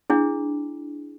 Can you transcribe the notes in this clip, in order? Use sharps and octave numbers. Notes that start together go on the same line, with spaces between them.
D4 E4 G#4